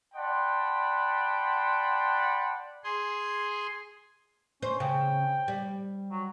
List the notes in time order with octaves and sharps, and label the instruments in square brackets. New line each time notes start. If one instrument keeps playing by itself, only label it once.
[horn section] D5 F#5 G5 A5 B5 C6
[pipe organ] G#4 C6
[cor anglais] C#4 [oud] C5
[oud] C#3 [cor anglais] G5
[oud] G3
[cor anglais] F#3